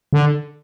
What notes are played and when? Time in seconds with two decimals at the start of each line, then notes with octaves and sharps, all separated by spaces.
0.13 D3